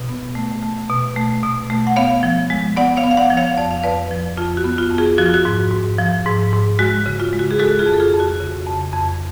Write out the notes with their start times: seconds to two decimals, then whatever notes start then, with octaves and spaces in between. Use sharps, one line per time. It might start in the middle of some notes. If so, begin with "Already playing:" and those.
Already playing: B2
0.09 B3
0.35 A3
0.63 A3
0.89 B2
1.16 A3
1.43 B2
1.70 A3
1.87 F#5
1.96 B3 C#5 F5
2.23 F3
2.50 G#3
2.77 B3 D5 F#5
2.97 C#5 F5
3.04 B3
3.11 F5
3.17 D5 F#5
3.30 F3
3.37 C#5 F5
3.57 F2 D5
3.71 F5
3.83 F2 B4 D5
4.11 F3
4.38 F2 F4
4.57 F#4
4.64 B3
4.78 F4
4.91 F2
4.98 F4 G#4
5.18 F3 F#4
5.26 F4
5.34 F#4
5.45 G#2
5.72 G#2
5.99 F3
6.26 G#2
6.53 G#2
6.79 G#3 F#4
7.06 C#3
7.20 F4
7.33 G#3
7.39 F#4
7.51 G#4
7.59 G#3 F#4 A4
7.79 F4 G#4
7.86 F2
7.94 A4
8.00 F4 G#4
8.13 F2
8.20 F#4
8.40 C#3
8.67 F2
8.93 F2